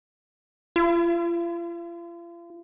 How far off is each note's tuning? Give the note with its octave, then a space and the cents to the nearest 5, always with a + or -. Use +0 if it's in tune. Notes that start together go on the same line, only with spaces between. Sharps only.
F4 -40